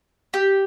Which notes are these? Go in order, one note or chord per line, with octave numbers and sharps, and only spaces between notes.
G4